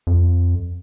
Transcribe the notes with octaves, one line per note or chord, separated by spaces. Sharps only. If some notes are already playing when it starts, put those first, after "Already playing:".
F2